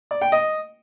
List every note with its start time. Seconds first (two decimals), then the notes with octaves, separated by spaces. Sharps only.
0.11 D5
0.21 G5
0.32 D#5